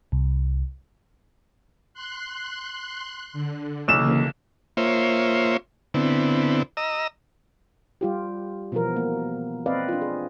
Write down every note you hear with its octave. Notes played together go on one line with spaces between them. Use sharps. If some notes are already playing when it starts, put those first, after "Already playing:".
C2
C6 F#6
D3
B1 C#3 E3 A#3 E7
A#3 F4 C5 C#5 E5
D3 B3 C4 E4
D#5 A#5 E6
G3 F4 G4
B2 E3 F3 B3 A#4
A#3
C4 B4 D5 D#5 F5
D4 F4
G#4